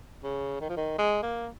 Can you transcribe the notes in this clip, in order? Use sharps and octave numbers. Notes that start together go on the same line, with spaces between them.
C#3
D#3
F3
D#3
G#3
A#3